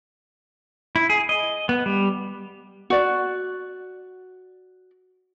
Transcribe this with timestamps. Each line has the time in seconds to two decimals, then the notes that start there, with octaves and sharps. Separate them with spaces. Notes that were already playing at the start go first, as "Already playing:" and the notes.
0.96 E4
1.10 G#4
1.29 D#5
1.69 B3
1.86 G3
2.90 F#4 D5